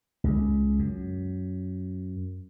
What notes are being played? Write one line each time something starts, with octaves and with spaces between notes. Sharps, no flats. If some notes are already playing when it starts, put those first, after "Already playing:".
C#2
F#2